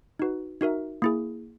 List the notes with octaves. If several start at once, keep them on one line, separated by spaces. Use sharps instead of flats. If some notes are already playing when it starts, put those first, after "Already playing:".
D#4 F#4 B4
D#4 F#4 A#4 E5
A#3 E4 G#4